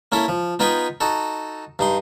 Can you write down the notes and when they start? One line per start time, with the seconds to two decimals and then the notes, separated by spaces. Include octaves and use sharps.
0.12 A#3 C#4 E4 A4
0.28 F3
0.59 B3 D#4 F4 B4 G5 G#5
1.01 D#4 F#4 A4
1.79 G2 D#4 C6